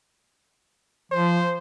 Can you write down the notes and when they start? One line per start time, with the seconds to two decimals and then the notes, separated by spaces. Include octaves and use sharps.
1.12 F3 C5